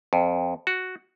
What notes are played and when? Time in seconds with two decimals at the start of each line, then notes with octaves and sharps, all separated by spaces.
0.13 F2
0.67 F#4